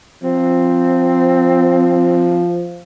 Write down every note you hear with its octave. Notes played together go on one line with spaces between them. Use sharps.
F3 C4